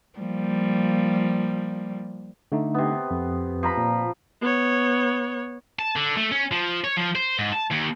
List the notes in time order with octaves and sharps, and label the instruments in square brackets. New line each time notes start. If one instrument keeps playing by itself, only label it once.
[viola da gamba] F3 G3 A#3
[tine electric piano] D3 A3 D#4
[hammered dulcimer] C3 B3
[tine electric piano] F2
[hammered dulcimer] F3 A#5 B5
[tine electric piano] A#2
[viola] B3 C#5
[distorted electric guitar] A5
D3
A3
C#4
F3
C#5
F3
C5
G#2
A5
D#2